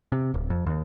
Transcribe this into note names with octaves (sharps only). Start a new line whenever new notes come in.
C3
D1
F2
D#2